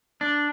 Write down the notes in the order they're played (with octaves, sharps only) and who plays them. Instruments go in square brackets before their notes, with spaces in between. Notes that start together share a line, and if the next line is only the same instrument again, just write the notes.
[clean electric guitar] D4